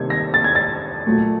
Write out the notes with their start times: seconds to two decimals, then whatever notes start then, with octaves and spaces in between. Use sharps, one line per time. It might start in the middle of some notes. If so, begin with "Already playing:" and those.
Already playing: C3 D#3 G3 G#6
0.10 A#6
0.34 A6
0.44 G#6
0.55 A6
1.06 A#2 F#3 A3